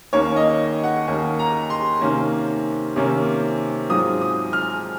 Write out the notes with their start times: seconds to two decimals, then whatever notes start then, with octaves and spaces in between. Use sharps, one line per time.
0.13 D#2 D#3 A#3 C#4 C#5
0.36 D#5
0.83 F#5
1.08 D#2 D#3 A#3 C#4
1.39 A#5
1.70 C6
2.01 C3 D#3 A#3 C#4
2.96 C3 D#3 A#3 C#4
3.89 G#2 F#3 C4 F4 D#6
4.21 D#6
4.53 F6